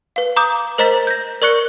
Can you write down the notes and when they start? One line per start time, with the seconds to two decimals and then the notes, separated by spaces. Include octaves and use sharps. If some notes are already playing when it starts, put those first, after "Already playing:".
0.16 B4 F5
0.36 A#5 D6 D#6 G6
0.78 A#4 C5 D#5 A#5 A6 B6
1.07 G6 A#6
1.42 A#4 D5 C#6 F#6 C#7